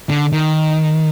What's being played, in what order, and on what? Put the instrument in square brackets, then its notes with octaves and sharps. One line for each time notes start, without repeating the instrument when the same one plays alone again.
[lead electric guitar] D3
D#3